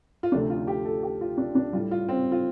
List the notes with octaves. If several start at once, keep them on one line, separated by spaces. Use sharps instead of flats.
F4
D2 C3 F3 A3 D4
F4
G4
A4
G4
F4
D4
D4
A2 G3 F4
F4
C4
F4